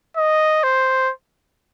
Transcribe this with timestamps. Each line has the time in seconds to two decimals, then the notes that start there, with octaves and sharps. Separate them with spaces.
0.17 D#5
0.64 C5